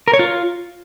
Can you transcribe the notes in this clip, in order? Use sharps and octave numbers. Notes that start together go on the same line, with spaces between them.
A#4
C#5
F4